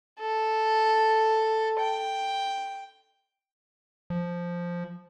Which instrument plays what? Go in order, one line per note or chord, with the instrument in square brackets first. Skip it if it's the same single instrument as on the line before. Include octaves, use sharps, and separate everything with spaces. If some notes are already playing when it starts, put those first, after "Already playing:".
[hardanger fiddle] A4
G5
[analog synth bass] F3